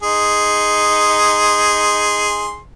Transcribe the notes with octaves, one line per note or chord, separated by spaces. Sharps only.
D#4 G#4 C6